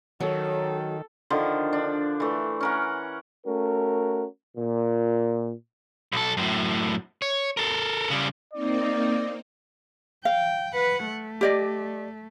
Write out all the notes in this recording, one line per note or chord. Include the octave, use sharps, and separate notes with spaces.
D#3 F#3 A4 C#5
D3 D#3 F3 C5
D4
E3 A3
C#4 A#4 F#5
A3 C#4 F#4 A#4
A#2
B1 A4
F#2 A2
C#5
A4 A#4
C#3 G3
A#3 C4 D#4 D5
F5 G5
B4 F#5
A3
G4 D5 D#5